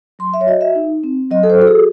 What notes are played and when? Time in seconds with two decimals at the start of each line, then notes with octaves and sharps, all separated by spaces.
0.19 F#3 C6
0.34 E5
0.41 C#5
0.47 F#4 D#5
0.61 E5
0.75 D#4
1.04 C4
1.31 F#3 D#5
1.43 A4
1.50 C5
1.58 F#4 A4
1.67 G#4